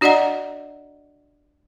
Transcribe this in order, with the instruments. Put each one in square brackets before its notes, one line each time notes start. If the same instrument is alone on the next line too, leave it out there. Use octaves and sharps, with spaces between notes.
[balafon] D4 F#4 D5 D#5 F#5 A#5